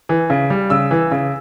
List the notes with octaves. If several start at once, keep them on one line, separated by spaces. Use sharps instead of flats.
E3
C#3
G3
C#3 E6
E3
C#3